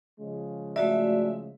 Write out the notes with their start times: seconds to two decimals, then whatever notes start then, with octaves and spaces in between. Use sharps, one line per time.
0.20 C#3 F3 G#3
0.76 A3 F#4 D5 E5